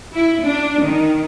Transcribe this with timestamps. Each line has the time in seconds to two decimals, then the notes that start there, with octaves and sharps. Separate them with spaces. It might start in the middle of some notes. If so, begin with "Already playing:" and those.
0.15 E4
0.44 D4
0.83 D#3